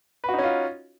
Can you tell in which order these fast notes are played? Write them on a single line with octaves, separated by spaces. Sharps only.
B4 F#4 D#4 C#4 F4